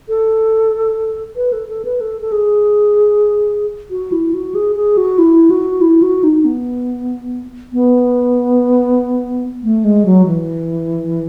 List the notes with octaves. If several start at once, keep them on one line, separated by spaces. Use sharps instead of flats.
A4
B4
A4
A4
B4
A4
A4
G#4
F#4
E4
F#4
G#4
G#4
F#4
E4
F#4
E4
F#4
D#4
B3
B3
A3
G#3
F#3
E3